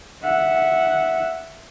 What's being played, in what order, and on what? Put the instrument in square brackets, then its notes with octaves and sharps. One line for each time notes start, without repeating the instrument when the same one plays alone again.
[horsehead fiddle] E5 F#5